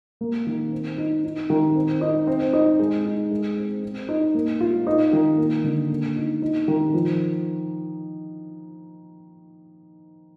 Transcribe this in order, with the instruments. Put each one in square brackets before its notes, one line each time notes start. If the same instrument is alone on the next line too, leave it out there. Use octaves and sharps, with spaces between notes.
[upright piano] A#3
D#3
C4
D#4
D#4
D#3
C4
D#4
C4
D#4
G#3
D#4
G#3
C4
C4
D#4
A#3
F4
D#4
D#3
A#3
D3
A#3
D#4
D#4
D#3
F3